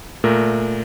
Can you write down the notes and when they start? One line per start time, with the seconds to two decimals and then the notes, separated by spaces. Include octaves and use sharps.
0.24 A#2 A3 A#4